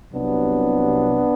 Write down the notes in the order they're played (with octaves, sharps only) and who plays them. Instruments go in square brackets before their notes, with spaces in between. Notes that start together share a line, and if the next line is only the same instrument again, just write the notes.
[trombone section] C2 C3 F#3 B3 D4